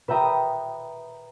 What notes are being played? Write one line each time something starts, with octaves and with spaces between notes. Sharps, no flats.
B4 E5 G5 A#5 D#6